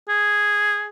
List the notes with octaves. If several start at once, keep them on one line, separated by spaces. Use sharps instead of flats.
G#4